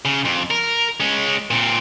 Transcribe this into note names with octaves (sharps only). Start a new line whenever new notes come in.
C#3
F2
A#4
G#3 C#4
A#2 C4